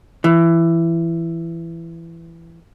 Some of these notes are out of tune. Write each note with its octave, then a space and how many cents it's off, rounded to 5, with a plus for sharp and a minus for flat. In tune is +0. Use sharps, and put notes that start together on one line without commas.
E3 +15